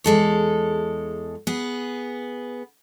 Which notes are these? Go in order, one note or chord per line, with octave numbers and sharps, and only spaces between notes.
E2 G#3 A4 C#5
B3 G#4